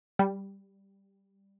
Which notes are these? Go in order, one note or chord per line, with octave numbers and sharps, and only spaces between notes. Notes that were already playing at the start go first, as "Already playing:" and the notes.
G3